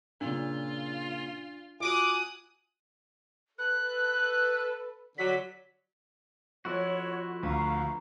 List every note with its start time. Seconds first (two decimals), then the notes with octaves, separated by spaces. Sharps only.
0.21 A#2 C#3 D4 F4
1.80 F4 F#4 G#5 D6 D#6 F#6
3.58 A4 B4 F#6
5.18 D3 F#3 B6
6.65 F2 E4 F#4 A4 C#5
7.43 D2 B4 F5 A#5 C#6